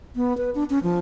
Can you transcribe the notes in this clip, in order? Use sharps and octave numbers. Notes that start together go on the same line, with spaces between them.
B3
B4
D4
C#4
F3